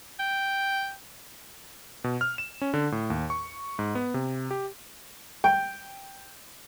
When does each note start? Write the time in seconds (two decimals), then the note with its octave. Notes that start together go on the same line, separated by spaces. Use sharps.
0.20 G5
2.04 B2
2.21 F6
2.38 E7
2.62 C#4
2.74 D3
2.92 A2
3.10 D#2
3.30 C#6
3.79 G#2
3.95 B3
4.14 C3
4.51 G4
5.44 G5